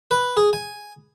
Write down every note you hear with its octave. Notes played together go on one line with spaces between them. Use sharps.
B4
G#4
G#5